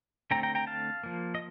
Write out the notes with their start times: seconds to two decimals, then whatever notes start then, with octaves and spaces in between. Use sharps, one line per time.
0.31 D3 A3 C4 G5 A#5
0.43 G5 A#5
0.55 G5 A#5
0.67 F5 A5
1.04 F3 A#3
1.35 D#5